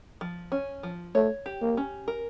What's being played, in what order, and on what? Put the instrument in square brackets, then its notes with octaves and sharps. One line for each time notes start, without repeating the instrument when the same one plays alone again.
[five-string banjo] F3
C#4
F3
[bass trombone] A3 [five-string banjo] C#5
[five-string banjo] G4
[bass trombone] A#3
[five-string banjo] C#4
A#4